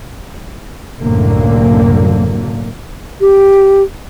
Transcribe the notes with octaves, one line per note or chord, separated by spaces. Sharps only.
C2 F#2 A2 D3 F#3 A#3
G4